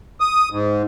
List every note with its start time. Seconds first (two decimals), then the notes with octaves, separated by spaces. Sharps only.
0.21 D#6
0.51 G#2